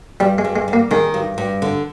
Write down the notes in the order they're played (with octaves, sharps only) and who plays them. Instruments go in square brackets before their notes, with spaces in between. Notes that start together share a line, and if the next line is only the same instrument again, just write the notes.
[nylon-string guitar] G2 [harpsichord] G3
[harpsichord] G#3
[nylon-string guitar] G2
[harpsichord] G#3
[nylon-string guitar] G3
[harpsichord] A#3
[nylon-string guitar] D#3 [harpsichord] G#3
[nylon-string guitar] G2
G2
D3